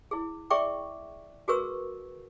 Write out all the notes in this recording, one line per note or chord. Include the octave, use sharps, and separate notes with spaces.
E4 G#4
G#4 D5 E5 G5 C#6 D6
F#4 G#4 A#4 B4 C#6 E6